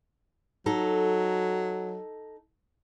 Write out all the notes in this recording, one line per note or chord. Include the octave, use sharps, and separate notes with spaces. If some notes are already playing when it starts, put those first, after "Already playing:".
F#3 D#4 A4